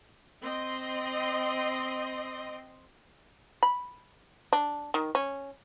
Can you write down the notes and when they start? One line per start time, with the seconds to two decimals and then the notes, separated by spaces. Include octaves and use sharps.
0.42 C4 D#5 C6
3.63 B5
4.53 D4
4.94 D#3
5.15 C#4